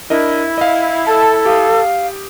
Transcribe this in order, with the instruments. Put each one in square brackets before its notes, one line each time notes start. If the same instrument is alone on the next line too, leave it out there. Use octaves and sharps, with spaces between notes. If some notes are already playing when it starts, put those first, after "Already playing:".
[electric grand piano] D4 A#4 D#5 [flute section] E4
[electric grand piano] D#5 F5
[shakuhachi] A4 [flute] A5
[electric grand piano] G4 D#6 [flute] F5